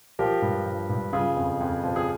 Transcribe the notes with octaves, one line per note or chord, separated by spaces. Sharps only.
F3 G4 A#4
G2
F3
G2
C#3 F4 G#4
F2
F2
F3
G#4